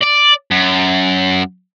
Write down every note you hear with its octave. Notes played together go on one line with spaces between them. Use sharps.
D5
F#2